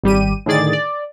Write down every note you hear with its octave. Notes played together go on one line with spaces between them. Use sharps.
G#1 G3 G4 D#7
A2 D3 D#3 G#4 D5 A6
D5